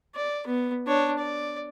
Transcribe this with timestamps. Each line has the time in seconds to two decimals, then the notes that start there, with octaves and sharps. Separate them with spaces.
0.15 D5
0.47 B3
0.87 D4 C#5
1.18 D5